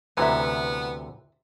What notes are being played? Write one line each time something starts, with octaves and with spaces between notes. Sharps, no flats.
D2 C3 E3 B3 E5 A#5